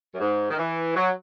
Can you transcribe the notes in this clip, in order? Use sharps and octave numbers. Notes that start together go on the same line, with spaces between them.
F#2
G#2
D#3
E3
F#3